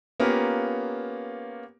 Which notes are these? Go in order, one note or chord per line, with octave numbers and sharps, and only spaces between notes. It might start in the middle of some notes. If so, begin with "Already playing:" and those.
A#3 B3 C#4 F4 G4